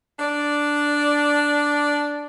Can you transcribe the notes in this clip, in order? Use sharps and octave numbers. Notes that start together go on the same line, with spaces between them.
D4 D5